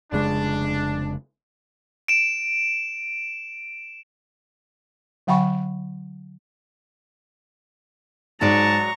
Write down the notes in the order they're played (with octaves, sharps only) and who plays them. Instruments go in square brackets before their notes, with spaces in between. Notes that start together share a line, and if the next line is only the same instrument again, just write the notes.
[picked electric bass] F1 C#3 G#3 [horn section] D4
[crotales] D7 E7
[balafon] D3 F#3 F#5 G5 B5 C#6
[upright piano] G#2 [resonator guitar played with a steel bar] F#3 G#3 D5 [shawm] A5 [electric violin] A#5 C#6